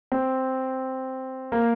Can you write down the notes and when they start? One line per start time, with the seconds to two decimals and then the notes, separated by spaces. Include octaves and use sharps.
0.12 C4
1.52 A#3